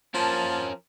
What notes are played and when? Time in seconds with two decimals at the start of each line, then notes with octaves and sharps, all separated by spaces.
0.14 F3 A#3 C#4 A#4 A5